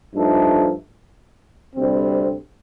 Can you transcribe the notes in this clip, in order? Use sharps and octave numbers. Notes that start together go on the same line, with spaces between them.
G2 F3 A3 D#4 A4
D2 C3 G3 C4